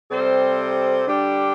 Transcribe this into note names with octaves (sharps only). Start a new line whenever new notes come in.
C3 G3 C4 A4 C5
D3 G3 D4 G4